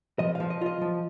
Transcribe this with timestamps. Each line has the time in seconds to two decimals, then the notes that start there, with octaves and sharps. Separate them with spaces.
0.19 F3 D#5
0.35 F3 F5
0.50 D#5
0.61 F4 D#5
0.81 F3